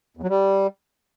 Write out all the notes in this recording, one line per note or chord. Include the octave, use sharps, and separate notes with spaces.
E2
F#3
G3